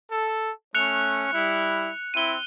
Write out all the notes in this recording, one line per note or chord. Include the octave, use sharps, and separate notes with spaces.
A4
A3 C#4 F#6 C#7 F7
G3 E4
C4 E4 D#7 G7